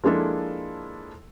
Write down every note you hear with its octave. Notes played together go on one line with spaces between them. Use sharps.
F3 G#3 A#3 D4 E4 A4